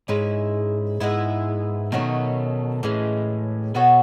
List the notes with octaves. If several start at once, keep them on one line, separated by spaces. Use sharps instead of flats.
G#2 G#3 C#4 E4 B4
G#2 G#3 B3 E4
B2 D#3 F#3 A3 C#4
A2 E3 G#3 C#4
B2 B3 F#4 A4 C#5